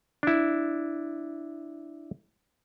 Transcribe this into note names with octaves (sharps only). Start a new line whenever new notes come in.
D4 E4